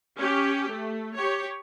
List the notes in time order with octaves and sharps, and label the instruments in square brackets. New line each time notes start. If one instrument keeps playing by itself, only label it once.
[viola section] C#4 G4
A3
G4 C#5